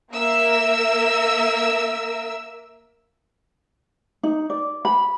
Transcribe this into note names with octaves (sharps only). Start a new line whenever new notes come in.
A#3 A#4 E5 E6
D#4
D5
B5